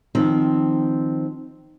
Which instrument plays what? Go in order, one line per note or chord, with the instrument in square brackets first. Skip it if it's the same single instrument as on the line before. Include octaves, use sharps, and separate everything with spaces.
[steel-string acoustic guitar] D#3 F3 C4